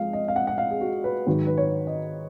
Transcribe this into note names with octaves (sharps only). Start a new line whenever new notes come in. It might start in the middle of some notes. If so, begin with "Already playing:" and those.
Already playing: F3 G#3 F5
D#5
F5
F#5
F#5
F5
G#4
F#4
B4
G#2 D#3 F#3 B4
B4
C#5
D#5